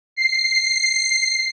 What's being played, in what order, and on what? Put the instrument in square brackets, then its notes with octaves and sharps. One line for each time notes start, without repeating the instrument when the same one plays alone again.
[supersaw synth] C7